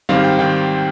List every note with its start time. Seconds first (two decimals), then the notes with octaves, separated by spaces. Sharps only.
0.09 G#2 D#3 G3 C4 F5
0.24 G5
0.39 D#3 G5